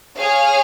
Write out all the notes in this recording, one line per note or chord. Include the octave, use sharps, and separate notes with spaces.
G#4 C#5 F5